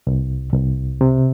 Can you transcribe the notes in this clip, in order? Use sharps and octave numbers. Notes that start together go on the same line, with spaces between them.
C2
C2
C3